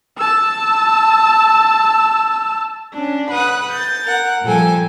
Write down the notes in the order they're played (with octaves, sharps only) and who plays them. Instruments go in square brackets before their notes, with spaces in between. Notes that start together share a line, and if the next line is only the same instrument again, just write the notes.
[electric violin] A5 E6
[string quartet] C#4 D4
B4 F#5 D#6 F#6
G6 A6
A#4 F#5
A#2 F3 G3 A4 G5 G#5